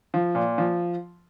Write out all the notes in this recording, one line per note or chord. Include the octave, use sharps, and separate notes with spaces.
F3
A#2
F3